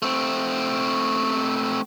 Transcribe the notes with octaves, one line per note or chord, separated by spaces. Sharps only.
A3 C4